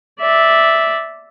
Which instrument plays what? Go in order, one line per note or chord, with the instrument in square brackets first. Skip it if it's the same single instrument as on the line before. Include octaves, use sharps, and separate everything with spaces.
[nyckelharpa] D5 E5